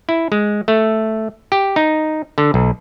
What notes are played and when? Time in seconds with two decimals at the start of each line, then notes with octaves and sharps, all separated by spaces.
0.09 E4
0.32 G#3
0.68 A3
1.52 G4
1.76 D#4
2.38 D3
2.54 B1